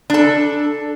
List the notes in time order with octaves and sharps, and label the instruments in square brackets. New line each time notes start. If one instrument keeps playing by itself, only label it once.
[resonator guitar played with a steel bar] D4 A4